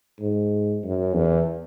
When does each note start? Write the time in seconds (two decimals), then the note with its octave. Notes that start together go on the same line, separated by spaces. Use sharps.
0.21 G#2
0.83 F#2
1.14 E2